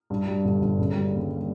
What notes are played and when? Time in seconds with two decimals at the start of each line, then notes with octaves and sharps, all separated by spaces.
0.10 G2
0.27 G3
0.45 G1
0.62 G1
0.79 C#3
0.96 G3
1.13 D#2